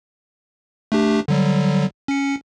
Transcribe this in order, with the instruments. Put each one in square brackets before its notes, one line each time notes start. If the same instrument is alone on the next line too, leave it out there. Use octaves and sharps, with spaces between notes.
[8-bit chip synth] A3 D4 G4
D3 F#3 G3
C#4 C#7